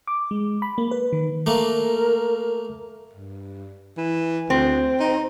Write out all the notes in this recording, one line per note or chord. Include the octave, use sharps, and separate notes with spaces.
D6
G#3
B5
A#3
B4
D#3
A3 A#3 A#4
G2
E3
D2 C4
D#4